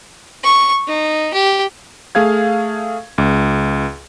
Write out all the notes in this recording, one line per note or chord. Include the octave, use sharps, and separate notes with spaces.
C#6
D#4
G4
A3 G#4 F5 G#6
C#2